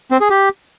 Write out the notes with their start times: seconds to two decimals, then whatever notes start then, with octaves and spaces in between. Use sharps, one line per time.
0.12 C4
0.21 G#4
0.30 G4